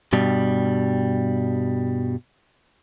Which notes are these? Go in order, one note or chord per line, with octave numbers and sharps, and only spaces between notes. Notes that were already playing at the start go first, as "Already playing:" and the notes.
G2 B2 G3